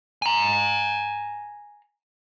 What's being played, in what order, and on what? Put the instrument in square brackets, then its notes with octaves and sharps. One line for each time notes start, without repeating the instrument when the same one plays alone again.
[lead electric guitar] G#5 A#5